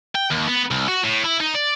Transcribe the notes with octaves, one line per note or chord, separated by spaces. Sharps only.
G5
D#2
B3
C2
F#4
A2
E4
D#4
D5